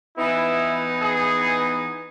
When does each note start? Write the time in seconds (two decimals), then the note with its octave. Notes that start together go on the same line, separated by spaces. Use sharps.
0.16 E3 B3 D#4 E4
1.02 G#4